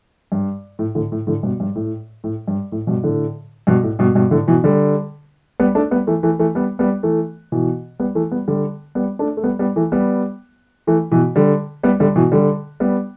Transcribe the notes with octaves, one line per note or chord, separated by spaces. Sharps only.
G2
A2
A2 D3
A2
A2 D3
G2 B2
G2
A2
A2
G2
A2
G2 B2
A2 D3
G2 B2
A2
G2 B2
G2 B2
A2 D3
B2 E3
D3 G3
G3 B3
A3 D4
G3 B3
E3 A3
E3 A3
E3 A3
G3 B3
G3 B3
E3 A3
B2 E3
G3 B3
E3 A3
G3 B3
D3 G3
G3 B3
A3 D4
A3
G3 B3
G3 B3
E3 A3
G3 B3
E3 A3
B2 E3
D3 G3
G3 B3
D3 G3
B2 E3
D3 G3
G3 B3